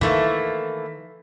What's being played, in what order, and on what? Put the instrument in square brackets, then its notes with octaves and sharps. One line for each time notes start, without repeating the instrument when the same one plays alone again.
[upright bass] D#3 [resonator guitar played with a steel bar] E3 A3 A#3